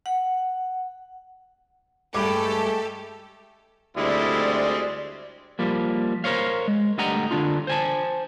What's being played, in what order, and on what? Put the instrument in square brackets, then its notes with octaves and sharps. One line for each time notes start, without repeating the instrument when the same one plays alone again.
[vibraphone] F#5
[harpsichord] G2 [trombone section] G#3 A3 [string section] G4 A4 [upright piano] G5 B5 D6
[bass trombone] D2 [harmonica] G3 G#3 C4 [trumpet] E4 [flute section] D5
[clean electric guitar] F3 G3 A#3
A#4 C5 C#5 F5
G#3
D2 D3 G3 D#5 F#5 A#5
D3 D4 F4
C5 G#5 A5